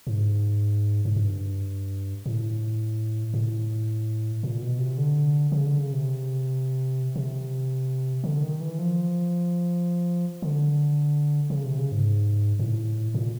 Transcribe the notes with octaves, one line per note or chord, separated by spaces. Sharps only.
G#2
G#2
G2
A2
A2
A#2
B2
C3
D3
C#3
D3
C#3
C3
C3
D3
D#3
E3
F3
D3
C#3
C3
C#3
G#2
A2
A#2